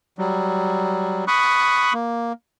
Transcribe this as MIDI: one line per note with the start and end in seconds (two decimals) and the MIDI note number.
0.19 1.25 54
0.19 1.25 55
1.28 1.93 83
1.28 1.93 85
1.28 1.93 87
1.28 1.93 90
1.94 2.33 58